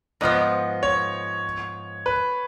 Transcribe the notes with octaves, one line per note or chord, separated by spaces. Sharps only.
G#2 F3 B3 D#5
C#5
B4